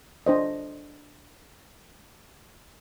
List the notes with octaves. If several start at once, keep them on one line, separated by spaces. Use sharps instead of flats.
D4 C5 D#5